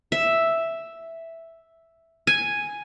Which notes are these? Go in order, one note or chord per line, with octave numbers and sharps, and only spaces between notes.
E5
G#5